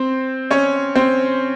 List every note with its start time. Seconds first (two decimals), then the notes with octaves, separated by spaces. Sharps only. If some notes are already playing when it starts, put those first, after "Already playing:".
Already playing: C4 C5
0.51 C#4 C#5
0.96 C4 C5